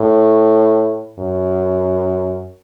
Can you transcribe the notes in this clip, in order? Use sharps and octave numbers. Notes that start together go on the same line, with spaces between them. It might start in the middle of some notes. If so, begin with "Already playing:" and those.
Already playing: A2
F#2